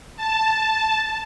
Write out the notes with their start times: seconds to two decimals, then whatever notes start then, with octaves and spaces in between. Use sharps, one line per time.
0.16 A5